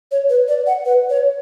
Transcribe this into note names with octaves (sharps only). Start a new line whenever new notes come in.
C#5
B4
D5
F#5
B4
C#5